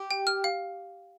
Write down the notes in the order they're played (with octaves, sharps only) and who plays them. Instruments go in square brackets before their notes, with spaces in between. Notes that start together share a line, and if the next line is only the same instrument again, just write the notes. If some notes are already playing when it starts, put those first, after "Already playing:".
Already playing: [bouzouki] G4
[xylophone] G5
F6
F5